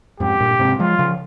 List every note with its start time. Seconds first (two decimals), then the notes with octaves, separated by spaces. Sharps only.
0.20 F2 G#2 G4
0.40 G2 A#2
0.59 G#2 C3
0.79 F3 G#3 F4
0.99 C#3 F3